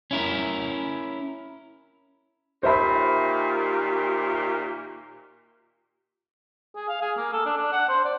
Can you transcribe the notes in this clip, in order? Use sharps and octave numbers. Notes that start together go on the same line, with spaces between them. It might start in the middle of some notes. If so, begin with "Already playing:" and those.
C#4 E4 A#4
A#2 D#3 G4 C5 E5 B5
G#4
F5
G#4
A#3
A4
D4
D4
F#5
C5
D5